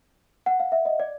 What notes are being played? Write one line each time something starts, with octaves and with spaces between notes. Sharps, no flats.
F#5
F5
E5
D#5
D5